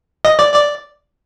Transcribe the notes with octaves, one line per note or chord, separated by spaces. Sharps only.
D#5
D5
D5